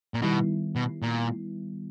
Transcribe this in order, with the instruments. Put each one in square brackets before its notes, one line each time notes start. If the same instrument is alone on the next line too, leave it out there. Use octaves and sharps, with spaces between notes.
[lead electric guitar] A#2
[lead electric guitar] B2 [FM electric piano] D#3 G3 B3 E4
[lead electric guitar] B2
A#2